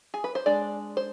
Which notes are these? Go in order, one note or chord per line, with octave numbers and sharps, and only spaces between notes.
G#4
B4
C5
G#3 D4 D5
C5